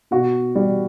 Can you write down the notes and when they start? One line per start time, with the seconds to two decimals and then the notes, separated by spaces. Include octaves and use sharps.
0.11 B2 F#4
0.55 G3